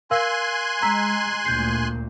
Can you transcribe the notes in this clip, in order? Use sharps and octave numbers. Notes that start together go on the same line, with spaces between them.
A#4 F5 G#5 C6 E6 F#6
G#3 A#5 E6 B6
D2 A#2 G6 C7